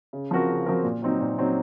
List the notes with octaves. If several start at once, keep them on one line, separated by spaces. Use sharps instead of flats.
C#3
F3 C4 F#4 A#4
C#3
F3 C4 F#4 A#4
A#2
F#3 C4 D#4
A#2
F#3 C4 D#4